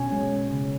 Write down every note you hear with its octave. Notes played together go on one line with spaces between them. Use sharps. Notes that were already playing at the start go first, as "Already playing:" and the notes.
Already playing: B2 C#4
G#3
G#3
C#3